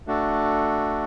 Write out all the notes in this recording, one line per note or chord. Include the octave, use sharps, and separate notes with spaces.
A3 D4 F#4 A4